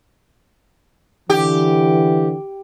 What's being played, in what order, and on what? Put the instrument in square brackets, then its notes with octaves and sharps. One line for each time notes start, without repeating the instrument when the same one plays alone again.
[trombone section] D3 E3 [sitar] G4